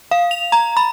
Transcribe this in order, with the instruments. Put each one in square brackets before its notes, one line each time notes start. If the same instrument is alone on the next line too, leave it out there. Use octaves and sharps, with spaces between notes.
[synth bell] F5
F7
A#5
B5